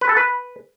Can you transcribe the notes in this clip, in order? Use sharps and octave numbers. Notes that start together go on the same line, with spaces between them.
B4
A4
B4